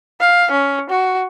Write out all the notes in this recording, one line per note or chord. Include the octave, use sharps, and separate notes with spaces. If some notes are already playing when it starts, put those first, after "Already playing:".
F5
C#4
F#4